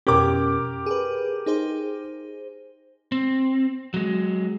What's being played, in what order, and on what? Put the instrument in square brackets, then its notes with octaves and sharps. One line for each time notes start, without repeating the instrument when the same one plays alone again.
[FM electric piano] F2 B2 C#4 [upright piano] G4 A#4 D6
[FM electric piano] G#4 B4
D#4 G#4 C5
[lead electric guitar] C4
F#3 G#3